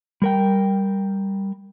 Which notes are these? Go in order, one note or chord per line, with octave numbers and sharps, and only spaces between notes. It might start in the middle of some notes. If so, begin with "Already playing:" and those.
G3 A#4 G5